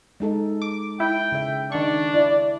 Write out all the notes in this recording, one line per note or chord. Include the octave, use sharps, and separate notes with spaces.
G#3 D#4 A4
D6
E4 G5
C#3 E5
D#3 D4 C#6
E4 D5